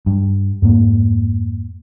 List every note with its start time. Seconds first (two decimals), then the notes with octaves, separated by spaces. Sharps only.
0.06 G2
0.62 F2 G#2 A#3